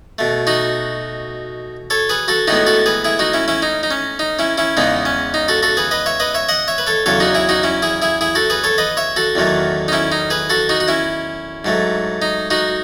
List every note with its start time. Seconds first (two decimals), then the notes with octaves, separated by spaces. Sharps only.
0.19 B2 A3
0.47 D#4 F#4
1.90 A4 C#5
2.09 G#4 B4
2.28 F#4 A4
2.48 A2 G#3 B3 D#4 F#4
2.67 F#4 A4
2.86 G#4 B4
3.05 E4 G#4
3.19 D#4 F#4
3.33 C#4 E4
3.48 C#4 E4
3.62 D#4
3.83 D#4
3.91 C#4
4.19 D#4
4.39 C#4 E4
4.58 C#4 E4
4.77 E2 C#3 G#3 B3 D#4
5.05 C#4
5.34 D#4
5.48 F#4 A4
5.63 F#4 A4
5.77 G#4 B4
5.91 B4 D#5
6.06 C#5 E5
6.20 B4 D#5
6.35 C#5 E5
6.49 D#5 F#5
6.68 C#5 E5
6.78 B4
6.87 A4 C#5
7.06 E2 C#3 F#3 A4 C#5
7.20 D#4 F#4
7.34 E4 G#4
7.49 D#4 F#4
7.63 C#4 E4
7.82 E4 G#4
8.02 E4 G#4
8.21 E4 G#4
8.35 F#4 A4
8.50 G#4 B4
8.64 A4 C#5
8.78 B4 D#5
8.97 C#5 E5
9.16 F#4 A4
9.35 E2 D#3 F#3 A3
9.88 D#4
9.92 C#4 E4
10.12 D#4
10.30 G#4 B4
10.50 F#4 A4
10.69 D#4 F#4
10.80 F#4
10.88 C#4 E4
11.65 G#2 F#3 A3
12.22 D#4
12.50 D#4 F#4